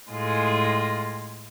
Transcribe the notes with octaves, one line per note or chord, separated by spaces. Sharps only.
A2 G#3 F4